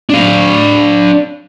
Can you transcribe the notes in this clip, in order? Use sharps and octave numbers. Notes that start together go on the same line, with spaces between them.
D4 F5